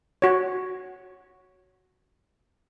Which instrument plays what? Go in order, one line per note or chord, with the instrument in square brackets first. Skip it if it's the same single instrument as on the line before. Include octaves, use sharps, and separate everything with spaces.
[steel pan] F#4 C#5